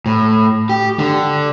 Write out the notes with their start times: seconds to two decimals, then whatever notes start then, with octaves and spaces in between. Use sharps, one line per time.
0.06 A2
0.69 G4
0.99 D3